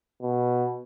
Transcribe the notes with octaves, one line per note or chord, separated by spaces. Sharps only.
B2